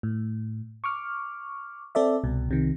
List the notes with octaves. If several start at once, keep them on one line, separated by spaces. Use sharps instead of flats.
A2
C#6 D6 F6
C4 A4 D5 E5
C2 B2
C2 C3 D#3